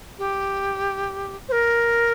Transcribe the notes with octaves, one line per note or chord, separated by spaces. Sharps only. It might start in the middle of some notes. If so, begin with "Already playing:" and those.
G4
C5
A#4